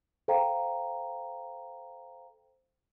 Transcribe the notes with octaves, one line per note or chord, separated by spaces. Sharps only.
A4 C5 F5 G5 A#5